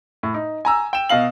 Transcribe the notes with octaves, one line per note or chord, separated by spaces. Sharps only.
A2
D#4
G#5 A#5 E6
G5 E7
B2 D#5 F5 F#7